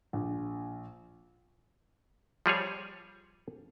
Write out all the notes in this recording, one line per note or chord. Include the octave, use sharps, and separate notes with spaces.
A#1
F3 G3 G#4 C#5